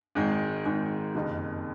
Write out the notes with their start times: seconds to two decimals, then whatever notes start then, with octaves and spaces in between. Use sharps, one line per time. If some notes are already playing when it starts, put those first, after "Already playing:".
0.15 G#1 G#2 D#3 G#3
0.65 G#1 G#2 D#3 G#3
1.15 F#1 F2 C3 D#3